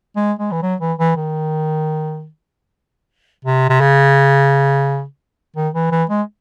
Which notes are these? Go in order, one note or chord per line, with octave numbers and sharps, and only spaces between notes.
G#3
G#3
E3
F#3
E3
E3
D#3
C3
C3
C#3
D#3
E3
E3
G#3